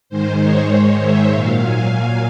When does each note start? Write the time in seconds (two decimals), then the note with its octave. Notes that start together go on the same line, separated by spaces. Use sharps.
0.09 G#2 D#3 G#3 C5
0.40 C#5
0.71 C5
1.01 E5
1.31 A#2 F#3 F5
1.62 G#5